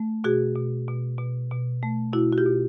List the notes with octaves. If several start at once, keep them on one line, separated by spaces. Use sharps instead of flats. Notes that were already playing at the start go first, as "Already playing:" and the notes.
Already playing: A3
B2 F#4 G#4
B2
B2
B2
B2
A3
B2 E4 F#4
F#4
F4 G4
B2